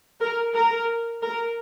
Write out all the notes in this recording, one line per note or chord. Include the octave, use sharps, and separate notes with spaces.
A#4
A#4
A#4